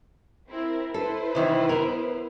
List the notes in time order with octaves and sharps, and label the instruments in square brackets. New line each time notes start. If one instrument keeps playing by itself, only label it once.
[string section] C4 E4 A#4
[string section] E4 B4 C5 [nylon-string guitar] A4
[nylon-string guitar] C3 D#3 E3
B3 A#4